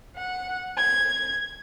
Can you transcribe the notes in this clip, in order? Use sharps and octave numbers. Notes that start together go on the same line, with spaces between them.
F#5
G#6